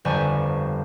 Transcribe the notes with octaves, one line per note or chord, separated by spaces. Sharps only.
G1 F2 G3 G#5 A5 C#6